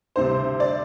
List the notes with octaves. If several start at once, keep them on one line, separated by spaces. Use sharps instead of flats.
D2 C3 G3 C5
D5